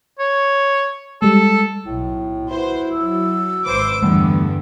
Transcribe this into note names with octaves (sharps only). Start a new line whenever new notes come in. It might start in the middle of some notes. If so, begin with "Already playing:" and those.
C#5
G3 G#3 A4
B1 A2
E4 F#4 B4 C5
F#3 E6
G#1 B4 C5 D6
E2 G2 D3 E3 G3 A3 B3